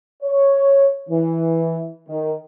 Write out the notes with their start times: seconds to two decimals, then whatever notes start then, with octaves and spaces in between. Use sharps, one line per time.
0.23 C#5
1.09 E3
2.09 D#3